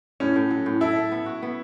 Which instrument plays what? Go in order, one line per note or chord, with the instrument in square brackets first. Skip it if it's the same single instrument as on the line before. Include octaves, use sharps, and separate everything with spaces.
[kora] A2 [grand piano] C#4
[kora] A2
F#3
A2
[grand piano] E4 [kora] A4
[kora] A4
B3
F#4
B3